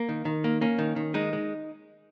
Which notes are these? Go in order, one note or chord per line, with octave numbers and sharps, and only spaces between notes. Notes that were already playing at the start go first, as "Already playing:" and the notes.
Already playing: A#3
D#3
D#3
A#3
A#3 C#4
D#3
D#3
G#3 D#4
G#3